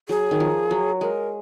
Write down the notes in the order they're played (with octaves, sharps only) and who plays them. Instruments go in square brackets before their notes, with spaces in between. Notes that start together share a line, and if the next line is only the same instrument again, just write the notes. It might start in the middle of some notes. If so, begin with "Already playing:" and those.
[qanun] F#3 [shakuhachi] G#4
[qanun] D#3
F3
F#3
[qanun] G#3 [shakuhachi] A#4